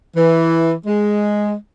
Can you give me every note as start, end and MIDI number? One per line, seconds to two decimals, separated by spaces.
0.16 0.72 52
0.86 1.53 56